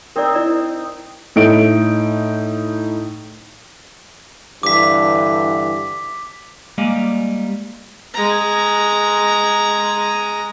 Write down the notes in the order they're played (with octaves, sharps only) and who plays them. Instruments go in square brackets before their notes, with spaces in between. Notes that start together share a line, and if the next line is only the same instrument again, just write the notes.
[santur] C4 D#4 [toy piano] A#4 D5
[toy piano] E4 D5 A#5
[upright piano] A2 D#4 D7
[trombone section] G2 D3 E3 [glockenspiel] D6 B6
[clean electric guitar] G3 G#3 A#3 D5 D#5 F5
[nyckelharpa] G#3 A#5